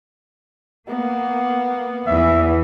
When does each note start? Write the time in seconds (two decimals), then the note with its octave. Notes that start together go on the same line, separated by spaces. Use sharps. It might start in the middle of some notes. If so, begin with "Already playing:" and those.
0.88 A#3 B3
2.07 E2 E3 E5